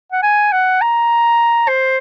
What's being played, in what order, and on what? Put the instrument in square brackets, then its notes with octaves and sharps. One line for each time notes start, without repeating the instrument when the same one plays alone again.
[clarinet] F#5
G#5
F#5
A#5
C5